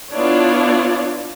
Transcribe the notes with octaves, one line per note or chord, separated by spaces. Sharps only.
B3 D4 E4 F4 C#5 D5